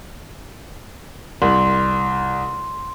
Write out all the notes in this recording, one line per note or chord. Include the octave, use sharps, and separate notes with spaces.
C2 C6